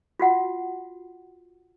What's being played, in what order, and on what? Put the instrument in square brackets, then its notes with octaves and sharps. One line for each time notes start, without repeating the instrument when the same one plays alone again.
[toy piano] F4 F#4 F#5